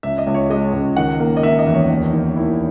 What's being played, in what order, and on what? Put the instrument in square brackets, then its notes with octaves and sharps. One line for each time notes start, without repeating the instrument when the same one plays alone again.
[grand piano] C#2 E5
D#5
C#2
C#5
G#3 D#5
C#2
D#3 F#5
A#3
D#5
D#3 E5
D#5
E2
C#5
D#2
D#3
D#2 E4